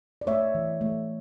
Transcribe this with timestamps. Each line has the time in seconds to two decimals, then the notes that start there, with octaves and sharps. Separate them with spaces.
0.21 D5
0.27 A3 C#5 E5
0.55 E3
0.81 A3